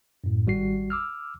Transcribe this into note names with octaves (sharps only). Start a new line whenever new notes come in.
F#2 A2
G#1 G3 F#4 C7
D6 E6 F6